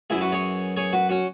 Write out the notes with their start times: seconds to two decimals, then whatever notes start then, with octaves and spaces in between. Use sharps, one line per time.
0.10 F#2 E3 E4 G#4
0.21 F#4 B4
0.32 G#4 C#5
0.77 G#4 C#5
0.93 F#4 B4
1.09 C#4 F#4